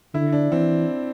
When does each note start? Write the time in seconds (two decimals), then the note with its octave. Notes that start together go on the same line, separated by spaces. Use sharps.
0.14 D3 E4
0.33 D4
0.52 E3 C4